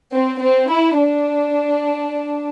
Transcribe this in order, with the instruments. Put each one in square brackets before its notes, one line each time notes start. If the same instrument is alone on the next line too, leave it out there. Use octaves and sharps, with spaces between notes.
[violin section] C4
C4
E4
D4